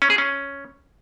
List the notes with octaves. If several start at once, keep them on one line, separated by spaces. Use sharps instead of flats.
C#4
G#4
C#4